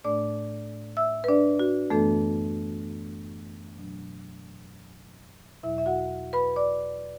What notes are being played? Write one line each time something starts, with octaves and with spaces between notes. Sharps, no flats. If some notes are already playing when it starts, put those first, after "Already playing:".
A2 A3 D4 D5 D6
E5 E6
B4
D4 D5
F#4
F#2 E3 A3 B3 D4 A4
B2 F#3 D4
E2 B2 F#3 E4 E5
E5
F#4 F#5
B4 B5
D5 D6